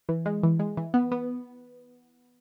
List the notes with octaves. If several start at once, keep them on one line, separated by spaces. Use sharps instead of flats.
E3
G#3
E3
G#3
E3
B3
B3